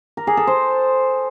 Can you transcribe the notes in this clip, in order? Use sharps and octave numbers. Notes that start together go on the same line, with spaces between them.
A#4
G#4
A4
C5